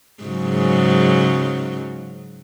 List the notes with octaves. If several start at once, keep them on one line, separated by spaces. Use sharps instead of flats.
G#2 C#3 F#3